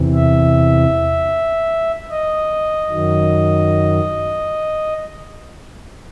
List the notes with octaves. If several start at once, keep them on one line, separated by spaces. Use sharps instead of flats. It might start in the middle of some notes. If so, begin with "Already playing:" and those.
Already playing: E2 C3 E3
E5
D#5
F#2 D#3 F#3